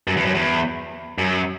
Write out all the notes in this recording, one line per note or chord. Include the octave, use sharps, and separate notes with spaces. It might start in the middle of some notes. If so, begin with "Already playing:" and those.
F#2
E2
F#2
E2
F#2